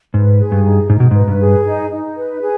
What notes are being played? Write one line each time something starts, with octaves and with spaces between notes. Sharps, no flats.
G#2 B4
G#4
G2
D#4
G#2 D#4
B2
G#2 B4
G2
G#4
D#4
D#4
B4
G#4